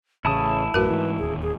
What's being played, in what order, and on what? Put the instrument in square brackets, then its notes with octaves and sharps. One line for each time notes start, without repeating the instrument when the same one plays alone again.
[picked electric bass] A1 [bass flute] C#3 [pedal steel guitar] E4 A5 D#6
[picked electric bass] A1 F#2 [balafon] A3 F#4 A#4 [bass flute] B4
[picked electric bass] G#2 E3
[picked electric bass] D1 D#2 [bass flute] G#4
[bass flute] G#4